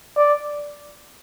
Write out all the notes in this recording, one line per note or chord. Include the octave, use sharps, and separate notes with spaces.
D5